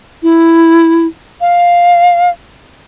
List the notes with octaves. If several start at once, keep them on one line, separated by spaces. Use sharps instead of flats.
E4
F5